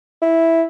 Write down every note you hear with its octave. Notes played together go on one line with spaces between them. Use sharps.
E4